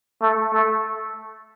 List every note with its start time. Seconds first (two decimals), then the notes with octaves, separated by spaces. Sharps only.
0.22 A3
0.53 A3